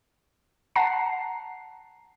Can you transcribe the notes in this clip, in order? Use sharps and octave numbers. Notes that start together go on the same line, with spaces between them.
F#5 A5 A#5 C7